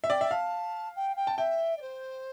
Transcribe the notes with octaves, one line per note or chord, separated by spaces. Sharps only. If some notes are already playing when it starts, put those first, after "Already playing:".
E5
D5 G5
E5
F5 A5
G5
G5
A5
E5 G5
D5
C5